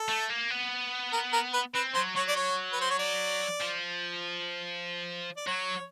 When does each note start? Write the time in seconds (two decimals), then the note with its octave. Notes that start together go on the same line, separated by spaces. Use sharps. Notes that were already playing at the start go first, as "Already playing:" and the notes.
Already playing: A4
0.09 A3
0.30 A#3
0.50 B3
1.12 A#4
1.33 A#4
1.53 B4
1.74 C4 B4
1.94 F#3 C5
2.16 F#3 C#5
2.28 D5
2.36 C#5
2.73 B4
2.81 C5
2.90 C#5
2.99 D5
3.61 F3
5.37 D5
5.47 F#3 C#5